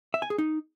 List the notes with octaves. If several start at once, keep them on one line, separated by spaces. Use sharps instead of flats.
E5
G#5
G#4
D#4